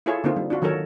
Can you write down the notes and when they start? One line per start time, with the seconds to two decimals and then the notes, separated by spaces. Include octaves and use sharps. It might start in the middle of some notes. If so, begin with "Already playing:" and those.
0.06 E4 F4 G#4 A4 C#5
0.24 D3 A#3 C4 D#4 F4
0.36 G3
0.50 D4 F4 F#4
0.62 D#3 F#3 D#4 A4 A#4 C#5